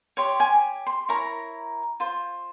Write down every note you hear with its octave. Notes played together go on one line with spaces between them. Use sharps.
G4 C#5 C6
G#5
C6
E4 A#4 C#5 A#5
F4 C5